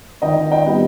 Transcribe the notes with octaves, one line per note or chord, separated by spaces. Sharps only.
D#3 D#5 G5
D#5 G5
G3 B3